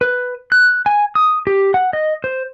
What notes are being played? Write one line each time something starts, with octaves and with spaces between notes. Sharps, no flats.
B4
F#6
G#5
D#6
G4
F#5
D#5
C5